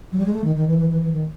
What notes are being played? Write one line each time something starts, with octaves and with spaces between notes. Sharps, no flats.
F#3
G3
G#3
A3
D#3
D#3
E3
E3
E3
E3
D#3